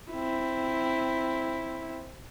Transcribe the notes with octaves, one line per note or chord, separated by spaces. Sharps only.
C4 E4